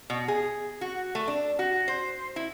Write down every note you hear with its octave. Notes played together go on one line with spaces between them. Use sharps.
B2
G#4
F#4
A3
D4
F#4
C5
E4